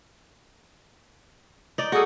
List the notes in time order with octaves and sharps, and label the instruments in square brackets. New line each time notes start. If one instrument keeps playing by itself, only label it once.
[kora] D#4 D5
[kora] F#4 A4 [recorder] G#4